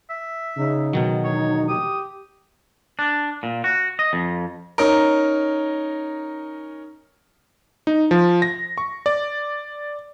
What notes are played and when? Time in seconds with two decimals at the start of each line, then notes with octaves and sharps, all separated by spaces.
0.10 E5
0.57 C#3 D#4
0.93 B2 D#3 F#3
1.24 E1 C#5
1.68 G4 D#6
2.99 D4
3.43 A#2
3.64 F#4
3.99 D#5
4.13 F2
4.78 C#4 D#4 A#4
7.87 D#4
8.11 F3
8.42 A#6
8.78 C#6
9.06 D5